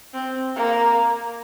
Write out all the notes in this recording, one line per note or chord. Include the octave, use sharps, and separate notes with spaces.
C4
A#3